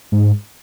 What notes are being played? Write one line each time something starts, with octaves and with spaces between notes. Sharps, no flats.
G#2